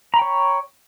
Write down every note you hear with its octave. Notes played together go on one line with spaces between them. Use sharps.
C#5 G5 A#5 B5